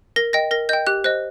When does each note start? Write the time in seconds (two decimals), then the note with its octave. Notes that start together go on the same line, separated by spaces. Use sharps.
0.16 A#4 A#6
0.33 D#5 G5 A#6
0.51 A#4 A#6
0.69 D#5 G5 G6
0.87 G4 F#6
1.04 C5 D#5 F#6